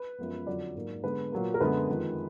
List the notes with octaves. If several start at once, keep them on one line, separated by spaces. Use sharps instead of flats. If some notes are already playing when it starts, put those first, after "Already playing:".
Already playing: B4
F#2 F3 G#3 B3
F2 D3 F#3 D5
G#2 F#3 A#3
D3 G#3 B3 B4
A#2 F#3 A#3
A#4
F#2 D3 G#3 B3 B4
F2 D#3 G#3